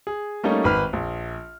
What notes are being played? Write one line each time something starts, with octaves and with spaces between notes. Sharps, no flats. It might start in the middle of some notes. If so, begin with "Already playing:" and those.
G#4
G3 A3 A#3 C#4 D#4
G#1 B4 B5 F6
A#1